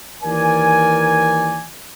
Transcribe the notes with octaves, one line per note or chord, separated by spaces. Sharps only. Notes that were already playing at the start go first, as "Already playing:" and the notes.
D#2 E3 A#4 D5 G#5